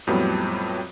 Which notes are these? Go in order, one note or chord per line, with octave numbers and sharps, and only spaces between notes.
F2 A2 F#3 G3 B3